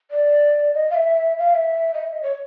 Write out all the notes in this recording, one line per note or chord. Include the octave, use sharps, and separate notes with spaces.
D5
D#5
F5
E5
F5
E5
D#5
E5
D#5
C#5